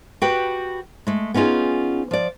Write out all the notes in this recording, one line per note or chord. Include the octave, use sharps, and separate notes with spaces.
F#4 G4 B4 G5
G#3 A3
B3 C#4 D#4 F4 G#4
F3 D5